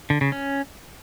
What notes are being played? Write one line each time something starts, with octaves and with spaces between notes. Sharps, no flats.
D3
C#3
C#4